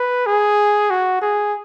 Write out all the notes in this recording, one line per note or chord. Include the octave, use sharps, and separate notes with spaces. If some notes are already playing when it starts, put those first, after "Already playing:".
Already playing: B4
G#4
F#4
G#4